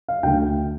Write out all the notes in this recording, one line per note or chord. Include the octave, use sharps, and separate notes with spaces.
F5
D2 D3 A3 G5